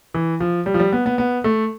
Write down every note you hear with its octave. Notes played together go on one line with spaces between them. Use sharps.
E3
F3
G3
F3
G3
B3
B3
B3
A3